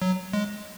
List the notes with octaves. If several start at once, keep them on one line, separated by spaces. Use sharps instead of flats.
F#3
G#3